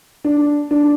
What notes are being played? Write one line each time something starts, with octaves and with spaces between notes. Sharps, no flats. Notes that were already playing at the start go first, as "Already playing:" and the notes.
D4
D4